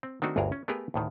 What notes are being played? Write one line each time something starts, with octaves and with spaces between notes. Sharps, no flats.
C4
D#3 A3 C4 D4 D#4 F#4
G1 D2 G2 G#4 A#4 A#5
C#4
A3 B3 G4 G#4 A#4 B4
D2 A2 D#3